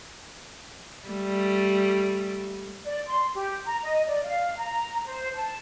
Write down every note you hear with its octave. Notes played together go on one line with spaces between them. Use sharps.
G3 A3
D5
C6
G4
A#5
D#5
D5
F5
A#5
C5
A5